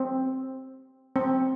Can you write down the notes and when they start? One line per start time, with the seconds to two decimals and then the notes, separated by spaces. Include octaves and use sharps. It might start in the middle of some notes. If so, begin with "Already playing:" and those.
Already playing: C4
1.16 C4